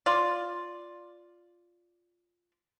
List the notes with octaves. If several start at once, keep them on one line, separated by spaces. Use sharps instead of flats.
F4 D5